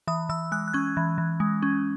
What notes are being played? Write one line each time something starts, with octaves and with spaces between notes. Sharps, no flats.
E3 D#6
E3 E6
G#3 F#6
F#6
C#4 G#6
E3
E3
G#3
C#4